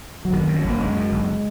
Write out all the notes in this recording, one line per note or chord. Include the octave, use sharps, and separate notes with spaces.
F#3
F#1 D#3
F#2
F#3
F#1
A#3
F#1 G#3
F#2
F#1